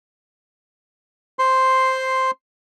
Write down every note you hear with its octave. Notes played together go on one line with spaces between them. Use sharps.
C5 C6